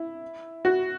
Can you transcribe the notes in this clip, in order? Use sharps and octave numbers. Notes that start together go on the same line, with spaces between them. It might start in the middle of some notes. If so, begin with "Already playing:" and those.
Already playing: E4
F#4